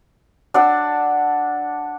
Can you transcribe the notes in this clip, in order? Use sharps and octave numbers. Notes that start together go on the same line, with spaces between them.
D4 F#5 E6